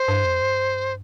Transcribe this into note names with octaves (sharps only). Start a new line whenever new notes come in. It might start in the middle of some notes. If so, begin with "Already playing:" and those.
Already playing: C5
G2
F2
G2